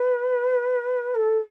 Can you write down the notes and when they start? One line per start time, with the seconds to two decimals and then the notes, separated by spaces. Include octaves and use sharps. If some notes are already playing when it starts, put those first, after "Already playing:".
Already playing: B4
1.14 A4